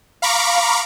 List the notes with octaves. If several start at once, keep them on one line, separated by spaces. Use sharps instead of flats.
F5 A#5 B5 C#6 D6